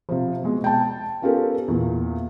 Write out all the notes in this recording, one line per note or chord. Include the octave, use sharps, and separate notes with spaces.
C3 F3
B2 G#3
G5 A5
B3 C#4 F4 G4 A4 A#4
E2 A#2